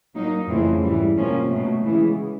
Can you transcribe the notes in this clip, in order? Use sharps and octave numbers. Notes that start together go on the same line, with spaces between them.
F#3 A#3 D#4
F2 C#3 E3 A3 C4
G#2 E3 G3
C3 F3 A#3 C#4
B2 F#3 A3
C#3 E3 G#3 B3